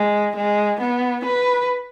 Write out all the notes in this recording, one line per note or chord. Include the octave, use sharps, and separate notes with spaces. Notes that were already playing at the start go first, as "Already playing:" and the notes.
Already playing: G#3
G#3
B3
B4